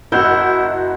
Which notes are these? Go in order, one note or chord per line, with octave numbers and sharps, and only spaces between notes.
F#1 E4 F#4 D#5 G6